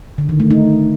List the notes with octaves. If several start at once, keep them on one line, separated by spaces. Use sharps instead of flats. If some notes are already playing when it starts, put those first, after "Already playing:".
D3
D#3
A3
D#4